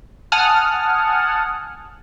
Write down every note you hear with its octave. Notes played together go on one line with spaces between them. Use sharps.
F#5 G#5 A5 D#6 F6